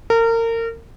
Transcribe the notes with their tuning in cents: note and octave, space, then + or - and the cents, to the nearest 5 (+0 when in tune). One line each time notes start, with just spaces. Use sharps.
A#4 -30